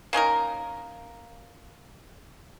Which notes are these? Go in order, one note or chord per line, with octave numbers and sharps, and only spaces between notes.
A#3 C#4 D#4 A#4